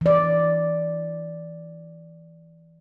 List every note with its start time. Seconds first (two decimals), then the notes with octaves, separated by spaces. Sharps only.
0.01 E3 D5